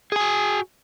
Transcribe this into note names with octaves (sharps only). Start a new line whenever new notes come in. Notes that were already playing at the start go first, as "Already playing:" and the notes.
F#4 G#4 G#5